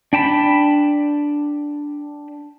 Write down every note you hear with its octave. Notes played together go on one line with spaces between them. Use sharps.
D4 G5 A5 B5